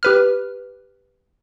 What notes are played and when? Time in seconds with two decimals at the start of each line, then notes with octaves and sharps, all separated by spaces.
0.03 G4 B4 F6